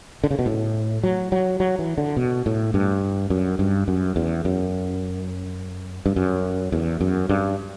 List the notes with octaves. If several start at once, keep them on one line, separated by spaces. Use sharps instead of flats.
D3
C#3
B2
A2
F#3
F#3
F#3
E3
D3
B2
A2
G2
F#2
G2
F#2
E2
F#2
G2
F#2
E2
F#2
G2